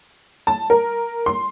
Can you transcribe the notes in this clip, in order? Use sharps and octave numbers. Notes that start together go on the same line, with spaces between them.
A5
A#4
C6